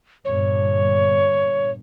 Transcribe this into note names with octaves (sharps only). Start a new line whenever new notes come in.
G1 G2 A#2 C#5